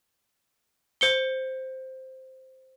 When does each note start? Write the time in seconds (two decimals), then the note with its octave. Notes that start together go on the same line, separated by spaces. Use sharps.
1.01 C5 C#7 G7